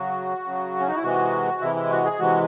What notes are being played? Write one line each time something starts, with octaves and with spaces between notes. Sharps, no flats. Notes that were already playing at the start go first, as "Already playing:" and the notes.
Already playing: C#3 F#3 F#4
C#3 F#3
C#4
D#4
E4
C3 E3 G#3 F#4
C3 E3 G#3 E4
E4
F#4
G#4
C3 E3 G#3 F#4